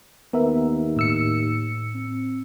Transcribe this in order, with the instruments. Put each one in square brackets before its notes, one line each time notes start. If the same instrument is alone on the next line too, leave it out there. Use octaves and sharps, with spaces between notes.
[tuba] D#2 [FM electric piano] B3 A#4 E5
[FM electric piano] A2 E6 C#7
[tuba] C4